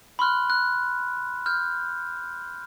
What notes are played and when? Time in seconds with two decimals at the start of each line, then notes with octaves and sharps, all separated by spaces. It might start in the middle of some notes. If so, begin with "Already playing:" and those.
0.19 B5 C6 F6 F#6
0.50 F#6
1.46 F6 G6